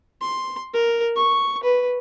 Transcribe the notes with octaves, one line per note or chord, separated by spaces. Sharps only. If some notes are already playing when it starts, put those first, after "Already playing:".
C6
A#4
C#6
B4